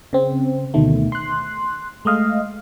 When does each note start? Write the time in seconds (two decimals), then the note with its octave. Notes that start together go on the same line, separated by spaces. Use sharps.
0.13 C#3 C4
0.74 D2 B2 D#3 A3
1.12 C6 F#6
2.05 G#3 A3 D#5 F5